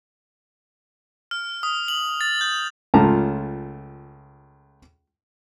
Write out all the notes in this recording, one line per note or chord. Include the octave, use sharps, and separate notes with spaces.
F6
D#6
F#7
A6
G6
C#2 A3 C#4 F4 A5 A#5